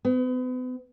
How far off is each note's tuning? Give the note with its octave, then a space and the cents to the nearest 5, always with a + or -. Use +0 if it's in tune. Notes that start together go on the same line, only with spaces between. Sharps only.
B3 +40